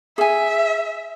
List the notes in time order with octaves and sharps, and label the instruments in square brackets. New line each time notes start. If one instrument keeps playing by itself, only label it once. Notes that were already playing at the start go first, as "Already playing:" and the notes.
[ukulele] G#4 G#5 [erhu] E5